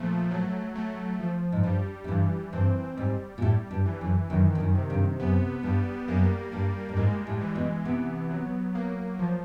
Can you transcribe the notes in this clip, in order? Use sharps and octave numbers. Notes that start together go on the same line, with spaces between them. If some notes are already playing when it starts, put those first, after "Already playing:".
Already playing: A#2 F3 A3
F#3
A3
F3
G#2
G2 G3
F#2
G2 E3
G2 C4
G#2 G3
A#2
A2 G3
G2
E3
F#2
F#2 D#3
G2
F#2
C3
G2
F#2 B3
G2 G3
F#2 A#3
G2 G3
G2
G#2 G#3
A2
E3
B2
C3 B3
F#3
A#3
F3